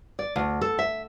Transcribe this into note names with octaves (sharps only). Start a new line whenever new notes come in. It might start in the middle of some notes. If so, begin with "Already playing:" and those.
D5
D2
A4
E5